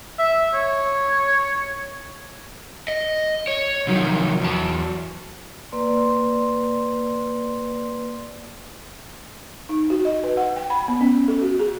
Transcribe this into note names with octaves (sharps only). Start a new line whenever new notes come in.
E5
C#5
D#5
C#5
C3 D#3 F3 F#3
E2 A5
A#3 B4 D5 C6
D#4
F#4
D#5
B4
F#5
G5
B5
B3
C#4
A4
F#4
G#4